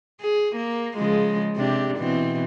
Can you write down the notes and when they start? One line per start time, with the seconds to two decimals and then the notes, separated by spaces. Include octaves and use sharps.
0.21 G#4
0.56 A#3
0.97 C#3 F3 G#3
1.56 C3 D4 G4
1.97 B2 E3 C4